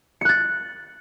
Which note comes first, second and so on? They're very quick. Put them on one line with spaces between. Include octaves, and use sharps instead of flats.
C#7 F#6 A6